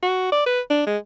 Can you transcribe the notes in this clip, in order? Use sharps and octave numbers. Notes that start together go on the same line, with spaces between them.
F#4
D5
B4
D4
G#3